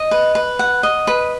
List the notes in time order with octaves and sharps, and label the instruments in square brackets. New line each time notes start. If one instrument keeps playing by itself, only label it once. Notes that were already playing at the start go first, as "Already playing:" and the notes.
Already playing: [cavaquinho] D#5
B4
B4
F#5
D#5
B4